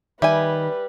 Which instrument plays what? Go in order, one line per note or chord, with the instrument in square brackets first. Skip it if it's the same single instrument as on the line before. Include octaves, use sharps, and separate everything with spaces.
[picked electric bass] D#3 [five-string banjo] G3 G#5 [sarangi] B4 [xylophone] E5